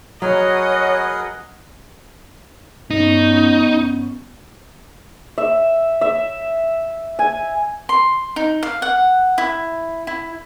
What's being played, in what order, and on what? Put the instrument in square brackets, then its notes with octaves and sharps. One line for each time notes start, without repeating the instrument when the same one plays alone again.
[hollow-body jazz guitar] F#3 [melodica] G#4 A#4 B4 [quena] C#5 [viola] D#5 F#5
[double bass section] G2 B3 C#4 [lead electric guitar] D#4
[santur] E5
E5
G#5
[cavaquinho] C6
D#4
F5
F#5
E4
E4